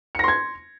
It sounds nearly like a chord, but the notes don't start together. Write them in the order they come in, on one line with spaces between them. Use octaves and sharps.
C#7 A#6 C6 G#6